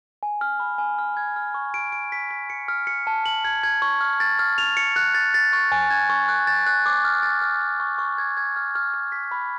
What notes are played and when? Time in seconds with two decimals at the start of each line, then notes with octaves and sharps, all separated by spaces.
0.23 G#5
0.41 F6
0.60 B5
0.78 G#5
0.99 F6
1.17 G#6
1.36 F6
1.54 C#6
1.74 D7
1.92 D7
2.12 B6
2.31 B6
2.50 C#7
2.68 F6
2.87 C#7
3.07 A5
3.26 F#7
3.45 G#6
3.63 G#6
3.82 C#6
4.01 F6
4.20 A6
4.39 F6
4.58 F7
4.77 C#7
4.96 F#6
5.14 A6
5.34 A6
5.53 C#6
5.72 G#5
5.90 G#6
6.10 C#6
6.29 F#6
6.47 A6
6.66 F#6
6.86 D6
7.05 F6
7.23 A6
7.42 F6
7.61 F6
7.80 C#6
7.98 C#6
8.18 G#6
8.37 G#6
8.56 F6
8.75 F6
8.94 F6
9.12 B6
9.31 B5